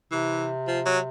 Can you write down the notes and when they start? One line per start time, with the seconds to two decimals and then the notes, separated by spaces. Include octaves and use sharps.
0.11 C3 E3
0.67 F3
0.85 F#3